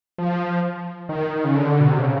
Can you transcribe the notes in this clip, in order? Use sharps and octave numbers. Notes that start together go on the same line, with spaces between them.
F3
D#3
C#3
D3
B2
C3
C#3